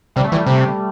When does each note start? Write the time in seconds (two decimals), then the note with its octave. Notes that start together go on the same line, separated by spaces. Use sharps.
0.16 C3 G3
0.24 A3
0.32 E3 G3
0.46 C3